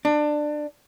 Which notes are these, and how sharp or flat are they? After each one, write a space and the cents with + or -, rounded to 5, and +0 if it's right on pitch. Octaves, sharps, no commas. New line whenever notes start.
D4 +20